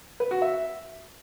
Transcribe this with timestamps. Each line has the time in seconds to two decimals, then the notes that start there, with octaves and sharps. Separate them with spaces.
0.20 B4
0.31 F#4
0.42 E5